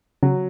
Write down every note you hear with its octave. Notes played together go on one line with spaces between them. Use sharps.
C#3 F#3